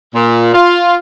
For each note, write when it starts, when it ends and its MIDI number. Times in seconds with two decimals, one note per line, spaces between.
0.15 0.52 46
0.54 0.95 65